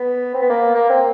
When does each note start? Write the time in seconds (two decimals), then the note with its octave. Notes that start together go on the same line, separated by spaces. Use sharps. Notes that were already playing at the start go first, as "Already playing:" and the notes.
Already playing: B3
0.34 C4
0.42 B3
0.50 A#3
0.75 A#3
0.90 C4